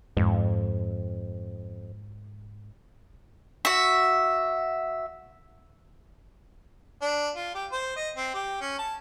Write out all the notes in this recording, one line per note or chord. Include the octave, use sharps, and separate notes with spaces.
F2 G#2
F#4 E5
D4
F4
G4
C5
D#5
C4
G4
C#4
A5